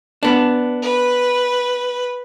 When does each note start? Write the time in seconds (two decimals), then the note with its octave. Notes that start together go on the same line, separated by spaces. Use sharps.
0.23 B3 D4
0.82 B4